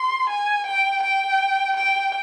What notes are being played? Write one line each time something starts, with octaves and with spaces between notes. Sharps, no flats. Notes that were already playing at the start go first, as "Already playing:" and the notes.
Already playing: C6
G#5
G5
G5
G5